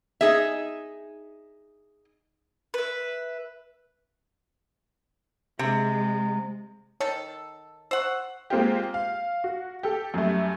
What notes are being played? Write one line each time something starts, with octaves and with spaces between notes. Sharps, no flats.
D#4 G#4 E5
B4 E5
C3 G#3
D#3 A4 C#5
C5 F#5 C#6 E6
G#3 A#3 C4 F4 G4
F5
F#4
G4 A4
F#2 G3 A3